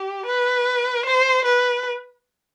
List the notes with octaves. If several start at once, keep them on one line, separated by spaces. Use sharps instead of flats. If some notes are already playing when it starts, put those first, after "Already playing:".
Already playing: G4
B4
C5
B4